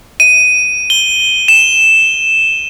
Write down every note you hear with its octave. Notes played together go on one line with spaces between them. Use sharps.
D#7
G7
E7